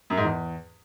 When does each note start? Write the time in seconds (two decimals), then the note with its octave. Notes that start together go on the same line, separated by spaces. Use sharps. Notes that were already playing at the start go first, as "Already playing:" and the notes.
0.10 F#2
0.17 G#2
0.24 E2